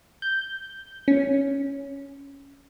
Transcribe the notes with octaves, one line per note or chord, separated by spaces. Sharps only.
G6
C#4